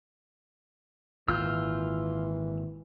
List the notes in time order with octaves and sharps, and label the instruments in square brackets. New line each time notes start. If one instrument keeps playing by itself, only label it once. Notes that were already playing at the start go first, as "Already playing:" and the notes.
[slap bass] G#1 A#2 [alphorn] E3 [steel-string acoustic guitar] F4 [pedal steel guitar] E6 F6 G6